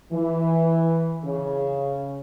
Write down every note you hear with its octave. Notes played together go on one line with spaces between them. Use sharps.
E3
C#3